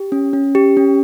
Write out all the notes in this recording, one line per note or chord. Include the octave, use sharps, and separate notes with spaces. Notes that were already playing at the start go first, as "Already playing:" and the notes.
Already playing: G4
C#4
C#4
G4
C#4